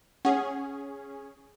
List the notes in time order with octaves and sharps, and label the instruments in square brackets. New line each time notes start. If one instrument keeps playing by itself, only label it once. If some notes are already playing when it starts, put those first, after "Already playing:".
[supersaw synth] C#4 G#4 [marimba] F#5